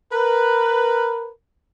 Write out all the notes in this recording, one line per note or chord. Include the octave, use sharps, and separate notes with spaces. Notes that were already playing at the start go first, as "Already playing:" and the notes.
A#4 B4